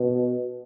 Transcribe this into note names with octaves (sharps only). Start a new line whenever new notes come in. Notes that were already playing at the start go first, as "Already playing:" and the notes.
Already playing: B2